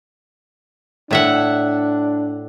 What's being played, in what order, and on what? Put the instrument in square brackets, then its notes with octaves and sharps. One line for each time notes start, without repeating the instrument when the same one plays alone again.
[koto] A2 E5 F#5 [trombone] D4